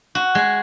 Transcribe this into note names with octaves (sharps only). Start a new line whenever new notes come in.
F#4
G#3